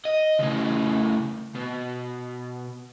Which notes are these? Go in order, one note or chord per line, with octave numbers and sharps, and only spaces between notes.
D#5
A2 C#3
B2